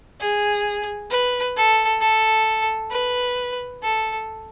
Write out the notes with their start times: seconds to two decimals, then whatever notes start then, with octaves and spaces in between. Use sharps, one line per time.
0.21 G#4
1.11 B4
1.57 A4
2.01 A4
2.91 B4
3.82 A4